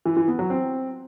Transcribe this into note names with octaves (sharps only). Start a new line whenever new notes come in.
E3
E3
B3
F#3
C4